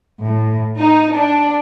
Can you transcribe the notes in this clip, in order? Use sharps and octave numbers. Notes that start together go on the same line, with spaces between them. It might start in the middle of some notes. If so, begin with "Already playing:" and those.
A2
D#4
D4